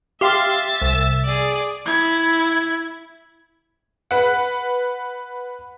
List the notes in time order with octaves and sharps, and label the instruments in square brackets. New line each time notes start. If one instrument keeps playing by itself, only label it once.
[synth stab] G4 F5 C6 [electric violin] E5 A6
[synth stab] C2 E6
[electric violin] G#4 D5
E4 G#6
[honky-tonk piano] B4 F#5